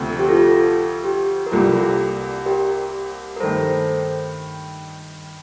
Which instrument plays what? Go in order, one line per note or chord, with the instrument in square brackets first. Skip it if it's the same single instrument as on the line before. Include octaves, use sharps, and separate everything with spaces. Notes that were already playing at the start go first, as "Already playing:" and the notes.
Already playing: [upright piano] D2 C3 F3 A3 C4
[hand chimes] A4
G4
F4 A4
G4
A#4
[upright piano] C2 C3 G3 A#3 D4 [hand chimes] F4 A4
[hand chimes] G4 A#4
A#4
[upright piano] G2 D#3 A3 [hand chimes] A4 C5